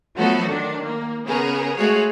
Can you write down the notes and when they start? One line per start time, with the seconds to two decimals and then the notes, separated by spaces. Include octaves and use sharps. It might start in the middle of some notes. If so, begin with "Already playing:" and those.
0.15 F3 F#3 A3 B3 F#4 A4
0.48 D#3 D4
0.85 A#3
1.26 C#3 B3 G#4 A#4
1.77 G#3 A3 F#4 G#4 C#5 F5